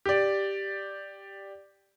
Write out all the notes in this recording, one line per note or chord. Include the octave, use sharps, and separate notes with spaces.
G4 D5